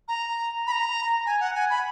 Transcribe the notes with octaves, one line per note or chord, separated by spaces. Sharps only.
A#5
B5
A#5
G#5
F#5
G#5
B5